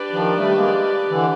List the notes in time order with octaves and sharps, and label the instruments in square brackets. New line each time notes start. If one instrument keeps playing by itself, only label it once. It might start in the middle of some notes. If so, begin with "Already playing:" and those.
Already playing: [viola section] D4 G4 B4 D5
[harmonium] D#3 F3
G3 A3
G#3 A#3
D3 E3